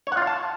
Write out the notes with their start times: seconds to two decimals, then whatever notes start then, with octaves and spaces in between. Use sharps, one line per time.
0.07 C#5
0.12 F#5
0.17 F4
0.22 F5
0.27 A5